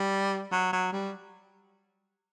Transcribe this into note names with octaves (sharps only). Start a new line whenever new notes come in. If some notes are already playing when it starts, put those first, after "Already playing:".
Already playing: G3
F#3
F#3
G3